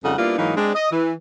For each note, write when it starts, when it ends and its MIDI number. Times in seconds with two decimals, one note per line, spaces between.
0.03 0.13 41
0.03 0.13 49
0.03 0.13 55
0.03 0.13 63
0.03 0.13 69
0.03 0.13 78
0.18 0.35 55
0.18 0.35 58
0.18 0.35 59
0.18 0.35 62
0.18 0.35 64
0.18 0.35 65
0.38 0.54 44
0.38 0.54 52
0.38 0.54 54
0.38 0.54 58
0.38 0.54 63
0.57 0.72 56
0.57 0.72 60
0.57 0.72 62
0.74 0.89 75
0.91 1.13 52